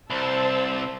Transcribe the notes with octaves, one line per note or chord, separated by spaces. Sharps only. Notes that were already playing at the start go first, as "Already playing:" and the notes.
C2 C5 A5 E6